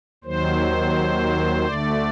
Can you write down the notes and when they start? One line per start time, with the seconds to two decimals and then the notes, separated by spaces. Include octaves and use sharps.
0.24 D#2 D#3 F#3 C5
1.66 D2 D3 A3 D5